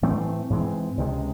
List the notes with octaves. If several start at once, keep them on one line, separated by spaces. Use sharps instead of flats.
A2 E3 A3 C4
G#2 E3 G#3 C4
C#2 C3 E3 G#3